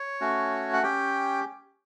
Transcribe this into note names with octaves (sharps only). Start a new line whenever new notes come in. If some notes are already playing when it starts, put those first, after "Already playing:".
Already playing: C#5
A3 C#4 F#4
F#5
C#4 G4 G5